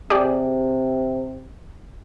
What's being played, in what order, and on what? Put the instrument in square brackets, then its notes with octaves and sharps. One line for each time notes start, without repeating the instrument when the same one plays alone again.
[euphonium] C3 [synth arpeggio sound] G4 G#4 D5